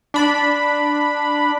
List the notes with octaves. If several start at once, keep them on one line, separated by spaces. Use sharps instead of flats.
D4 B5